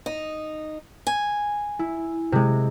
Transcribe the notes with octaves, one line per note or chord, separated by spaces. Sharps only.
D#4
G#5
E4
C3 G#3